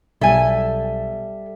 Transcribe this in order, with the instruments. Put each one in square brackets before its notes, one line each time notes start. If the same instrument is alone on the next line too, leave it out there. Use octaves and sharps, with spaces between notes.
[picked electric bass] B1 [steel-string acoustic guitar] G3 E5 [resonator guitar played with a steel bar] A4 G#5